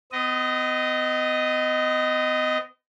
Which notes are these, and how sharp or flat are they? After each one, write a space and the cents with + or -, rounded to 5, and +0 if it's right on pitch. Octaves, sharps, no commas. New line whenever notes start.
B3 +45 D#5 +0